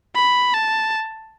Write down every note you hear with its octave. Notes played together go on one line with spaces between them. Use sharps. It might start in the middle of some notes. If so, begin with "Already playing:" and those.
B5
A5